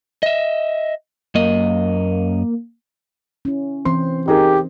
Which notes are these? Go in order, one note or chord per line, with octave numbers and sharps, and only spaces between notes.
D#5 E5
F#2 A#3 D#5
C#4 E4
E3 C4 C5 C6
D#4 G4 G#4 A#4